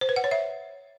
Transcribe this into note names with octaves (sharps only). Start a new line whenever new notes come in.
C5
B4
F#5
C#5
E5